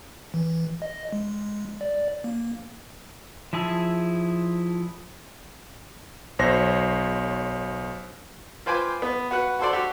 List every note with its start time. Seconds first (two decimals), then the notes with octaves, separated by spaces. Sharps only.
0.34 E3
0.82 D#5
1.13 G#3
1.81 D5
2.24 A#3
3.53 F3 E4 G#4 A5 E6
6.39 B1 C5 C#5 A#6
8.66 F4 B4 C5 G5 G#5 D6
9.02 B3
9.31 F#4 B4 F#5
9.59 F#4 A4 C5 D5
9.73 F#4 G4